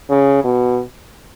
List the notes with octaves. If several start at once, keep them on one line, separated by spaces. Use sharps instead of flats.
C#3
B2